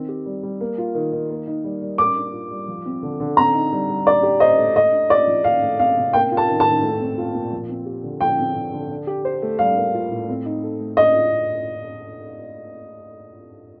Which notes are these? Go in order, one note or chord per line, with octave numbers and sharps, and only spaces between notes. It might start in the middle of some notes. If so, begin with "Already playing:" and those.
Already playing: D#3 C4
G4
G3
G3
A#3
F4
D#3
D#3
A#3
D#4
G3
G3
A#3 D6
D4
F4
G3
F3
C4
D3
D3
C4 A#5
D#4
G3
G3
D4 D5
G4
C5 D#5
A3
A3 D#5
D4
F4 D5
F3
D#3 F5
A3
C4 F5
C3
A#3 G5
F4
A5
D#3
A5
D#3
A3
C4
F4
A#2
F3
C4
G4
D3
F3 G5
C4
D3
D3
D4
G4
C5
A3
G3 F5
A#3
F4
A2
C4
D#4
A4
A3
D4 D#5
F4